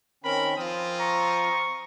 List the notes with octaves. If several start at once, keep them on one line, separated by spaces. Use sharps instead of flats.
D#3 C4 C#4 A#4 B5
F3 C4 F4 D#6
A#5 C#6